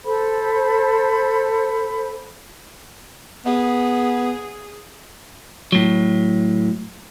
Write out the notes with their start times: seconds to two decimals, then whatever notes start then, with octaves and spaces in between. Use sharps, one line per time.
0.04 A4 C5 B5
3.46 B3 G#4
5.72 A2 F#3